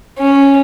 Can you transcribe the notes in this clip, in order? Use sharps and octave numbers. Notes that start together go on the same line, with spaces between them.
C#4